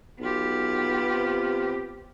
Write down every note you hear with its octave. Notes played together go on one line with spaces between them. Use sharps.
B1 B3 F4 G4
C3